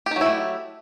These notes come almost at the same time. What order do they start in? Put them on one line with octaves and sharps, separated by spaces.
G4 D#4 F#3 E4 A3